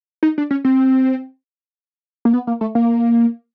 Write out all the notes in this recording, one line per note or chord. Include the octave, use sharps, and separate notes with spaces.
D#4
D4
C#4
C4
A#3
B3
A#3
A3
A#3